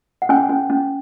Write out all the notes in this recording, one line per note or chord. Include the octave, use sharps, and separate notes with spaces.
F#5
C#4 G#5
C#4
C#4